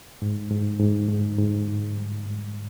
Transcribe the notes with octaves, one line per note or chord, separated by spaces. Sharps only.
G#2
G#2
G#2
G#2
G#2
G#2
G3
G#2